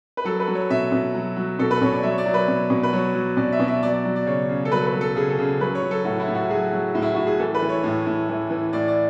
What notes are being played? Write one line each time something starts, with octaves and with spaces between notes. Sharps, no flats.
B4
F#3 A4
B4
F#3
C#5
B2 E5
B2
F#3
F#3
B2 A4
B4
B2 C#5
D5
F#3 E5
C#5
D5
F#3
B4
B2
B2
B4
F#3 C#5
F#3
B2 D5
E5
B2 D5
E5
F#3 D5
D5
F#3
D5
C#3 C#5
C#3
A4
F#3 B4
B4
F#3
A4
C#3 G#4
A4
C#3 G#4
F#3 B4
C#5
F#3
A4
A2 F#4
E4
A2
F#4
F#3 G#4
F#3
A2
E4
A2 F#4
G#4
E3 A4
B4
E3
C#5
A2
A2
E3
E3
A2 D5
D5